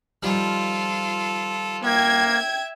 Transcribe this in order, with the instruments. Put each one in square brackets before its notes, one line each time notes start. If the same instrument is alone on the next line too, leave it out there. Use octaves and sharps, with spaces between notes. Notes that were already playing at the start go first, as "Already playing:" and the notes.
[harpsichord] D#3 F3 G3 [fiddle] F4 A4
[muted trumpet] A#3 [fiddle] E5 [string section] G5 G#6